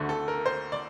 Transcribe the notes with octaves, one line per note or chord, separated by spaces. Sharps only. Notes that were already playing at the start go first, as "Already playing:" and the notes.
Already playing: D2 D3 A3
A4
A#4
C5
D5